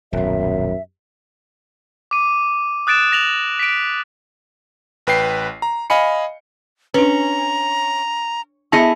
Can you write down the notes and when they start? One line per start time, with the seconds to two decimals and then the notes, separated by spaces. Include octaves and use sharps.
0.13 D#1 B1 F#2 E5
2.11 D6 D#7
2.87 D#6 F#6 A6 D7 E7
3.12 A#6 F7 F#7
3.59 B6 D7
5.07 A1 B4 G5 C7
5.62 A#5
5.90 D#5 F5 G#5 B5 C#7
6.94 C#4 D4 B4 A#5
8.72 B3 E4 G#4 D#5 A5 A#6 C#7